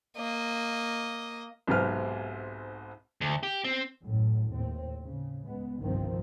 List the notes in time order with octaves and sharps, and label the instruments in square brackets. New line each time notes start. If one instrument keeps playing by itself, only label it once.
[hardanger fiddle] A#3 D#5
[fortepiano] B1 G#2 C3 C4 B4 F6
[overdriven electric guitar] D2
G4
C4
[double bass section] A1 F#2 A2
D#2 A2 C4
C#3
C#2 G#3 B3
G1 C2 G2 D#3 F3 C4